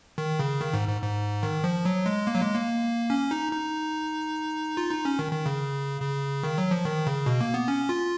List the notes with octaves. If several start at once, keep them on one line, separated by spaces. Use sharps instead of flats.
D#3
C#3
D#3
G#2
G#2
G#2
D#3
F3
F#3
G#3
A#3
F#3
G#3
A#3
C#4
D#4
D#4
F4
D#4
C#4
D#3
D#3
C#3
C#3
D#3
F#3
F3
D#3
C#3
B2
A#3
B3
C#4
F4